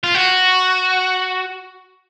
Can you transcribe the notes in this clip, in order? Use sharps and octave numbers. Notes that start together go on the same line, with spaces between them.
F4
F#4